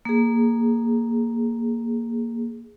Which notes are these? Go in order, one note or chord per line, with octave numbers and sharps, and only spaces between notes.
A#3 G#4